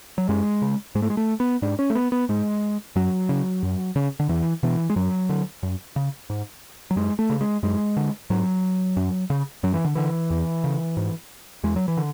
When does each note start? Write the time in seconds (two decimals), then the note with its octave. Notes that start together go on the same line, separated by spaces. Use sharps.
0.18 F#3
0.29 F#2 G#3
0.62 C#3
0.95 G#2 G#3
1.02 A3
1.10 G#3
1.17 A3
1.40 B3
1.62 G#2 D4
1.79 C#4
1.90 A3
1.95 B3
2.12 B3
2.29 G#2 G#3
2.96 F#2 F#3
3.29 C#3
3.63 F#2
3.96 C#3
4.20 D3
4.29 E2 E3
4.63 B2 E3
4.90 G#3
4.96 F#2 F#3
5.29 D3
5.63 F#2
5.96 C#3
6.30 G#2
6.91 F#3
6.96 F#2 G#3
7.19 A3
7.30 C#3
7.41 G#3
7.63 F#2 G#3
7.97 D3
8.30 G#2 F#3
8.97 F#2
9.30 C#3
9.63 F#2 F#3
9.74 E3
9.85 D3
9.95 D3 E3
10.30 E2
10.64 C#3
10.97 G#2
11.64 E2 G#3
11.76 F#3
11.88 E3
11.97 D3